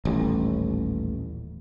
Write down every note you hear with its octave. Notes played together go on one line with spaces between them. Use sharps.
D#1 A1